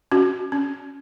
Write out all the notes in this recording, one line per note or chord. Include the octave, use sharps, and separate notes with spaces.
C#4 F#4
C#4